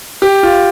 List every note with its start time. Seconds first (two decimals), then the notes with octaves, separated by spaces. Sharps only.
0.22 G4
0.43 F4